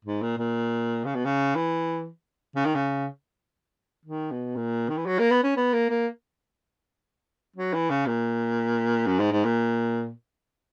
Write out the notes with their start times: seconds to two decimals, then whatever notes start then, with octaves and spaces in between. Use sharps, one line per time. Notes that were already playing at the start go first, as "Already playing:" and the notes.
0.05 G#2
0.22 A#2
0.38 A#2
1.05 C#3
1.15 B2
1.25 C#3
1.55 E3
2.56 C#3
2.65 D#3
2.75 C#3
4.06 D#3
4.31 B2
4.56 A#2
4.89 D#3
4.97 E3
5.06 F#3
5.19 A#3
5.31 B3
5.43 C#4
5.57 B3
5.73 A#3
5.89 A#3
7.56 F#3
7.74 E3
7.90 C#3
8.06 A#2
9.07 F#2
9.19 G#2
9.32 G#2
9.45 A#2